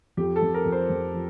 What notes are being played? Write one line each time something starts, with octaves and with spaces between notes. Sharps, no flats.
F2 G4
A4
F2
A#4
F2
C5
F2
F3